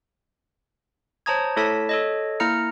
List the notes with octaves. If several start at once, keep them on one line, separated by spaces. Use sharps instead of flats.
C5 C#5 A5 A#5 D#6 G#6
A3 E4 A4 C#5 A5 B6
A4 C#5 D#5
A#3 E4 A#5 F6 C#7